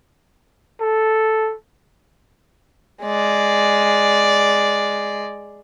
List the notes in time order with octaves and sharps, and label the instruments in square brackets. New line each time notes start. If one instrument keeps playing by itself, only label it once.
[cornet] A4
[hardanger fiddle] G#3 D5